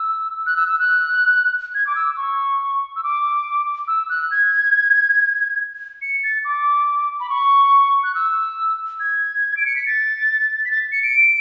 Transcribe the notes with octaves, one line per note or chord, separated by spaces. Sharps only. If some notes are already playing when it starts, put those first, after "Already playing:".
Already playing: E6
F#6
E6
E6
F#6
G#6
D6
E6
C#6
E6
D6
E6
F#6
G#6
C#7
A6
D6
B5
C#6
F#6
E6
G#6
D7
C#7
B6
A6
B6
A6
C#7
D7